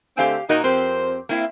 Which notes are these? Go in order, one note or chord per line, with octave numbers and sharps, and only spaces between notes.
D3 A3 C4 G4 F5 G#5
A#2 D#4 F#4 A#4
F2 C4 G4 A#4 C5
A#3 C4 E4